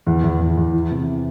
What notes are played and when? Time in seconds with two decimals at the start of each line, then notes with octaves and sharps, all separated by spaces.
0.07 E2
0.24 E2
0.41 E2
0.57 E2
0.73 E3
0.91 C3